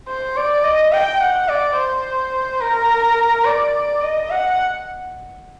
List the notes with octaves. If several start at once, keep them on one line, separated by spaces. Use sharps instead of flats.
C5
D5
D#5
G5
F#5
D5
C5
A#4
D5
D#5
F#5